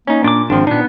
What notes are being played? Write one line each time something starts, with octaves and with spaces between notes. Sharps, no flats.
A#3 C#4 D#4
A#2 D4 D6
G#1 F3 C4 D4
A#2 B3 D4 D#4